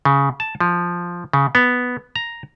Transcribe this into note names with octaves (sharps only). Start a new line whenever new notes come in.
C#3
A5
F3
C#3
B3
A#5